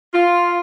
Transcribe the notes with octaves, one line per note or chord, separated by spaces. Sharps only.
F4